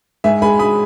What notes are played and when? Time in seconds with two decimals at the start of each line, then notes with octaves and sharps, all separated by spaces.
0.24 G#2 E5 G#5
0.42 G#3 G#5 B5
0.59 G#3 B5 D#6